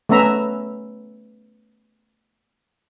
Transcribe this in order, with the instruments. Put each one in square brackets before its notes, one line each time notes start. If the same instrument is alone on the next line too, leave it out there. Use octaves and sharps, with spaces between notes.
[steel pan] A3 B3 C#4 E5 A#5